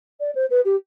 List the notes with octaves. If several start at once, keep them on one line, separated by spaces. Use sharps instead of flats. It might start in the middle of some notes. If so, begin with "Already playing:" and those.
D5
C5
B4
G4